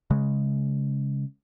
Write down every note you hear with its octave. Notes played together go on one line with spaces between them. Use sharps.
C#3 G#3